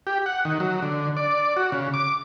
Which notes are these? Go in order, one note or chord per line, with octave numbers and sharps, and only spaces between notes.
G4
F#5
D#3
F#3
D3
D5
F#4
C#3
D6